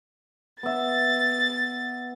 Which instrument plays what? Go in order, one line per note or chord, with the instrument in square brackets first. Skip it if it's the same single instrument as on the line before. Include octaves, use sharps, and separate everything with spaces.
[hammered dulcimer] B3 E5 [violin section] A6